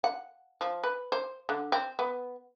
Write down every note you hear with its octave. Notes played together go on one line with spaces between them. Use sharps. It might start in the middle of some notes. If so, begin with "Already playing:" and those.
F#5
F3
B4
C5
D3
C4
B3